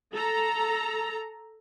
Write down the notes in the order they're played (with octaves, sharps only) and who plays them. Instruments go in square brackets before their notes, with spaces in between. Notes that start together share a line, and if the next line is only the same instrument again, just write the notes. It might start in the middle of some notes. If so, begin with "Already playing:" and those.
[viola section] A4 A#5